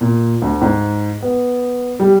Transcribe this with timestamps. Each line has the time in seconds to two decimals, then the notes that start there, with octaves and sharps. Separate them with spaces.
0.01 A#2
0.42 D2
0.61 G#2
1.23 B3
2.00 G3